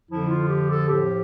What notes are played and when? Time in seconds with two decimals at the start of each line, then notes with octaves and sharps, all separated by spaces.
0.08 F2 D3 F3 E4
0.28 F4
0.47 G4
0.68 A4
0.88 A2 F3 G4